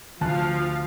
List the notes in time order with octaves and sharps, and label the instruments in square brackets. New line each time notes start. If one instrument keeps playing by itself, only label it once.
[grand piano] D2 A5 F#6 [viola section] F3 F5